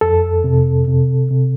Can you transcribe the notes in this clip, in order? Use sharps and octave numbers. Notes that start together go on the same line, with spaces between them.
F2 A4
C3
C3
C3